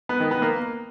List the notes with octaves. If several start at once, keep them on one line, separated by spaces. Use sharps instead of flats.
B3
D#3
B3
A#3